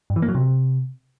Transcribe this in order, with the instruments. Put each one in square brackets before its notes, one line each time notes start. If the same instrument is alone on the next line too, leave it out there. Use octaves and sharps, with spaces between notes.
[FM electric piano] G2
E3
A#3
F#3
C3